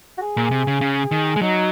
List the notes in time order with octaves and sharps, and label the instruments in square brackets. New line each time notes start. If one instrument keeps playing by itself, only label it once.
[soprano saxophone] F#4
G#4
[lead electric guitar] A#2
C3
C#3
C#3
D#3
G#3
[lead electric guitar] F#3 [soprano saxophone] D#4